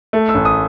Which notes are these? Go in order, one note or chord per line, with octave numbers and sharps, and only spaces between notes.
A3
E6
A1
D#6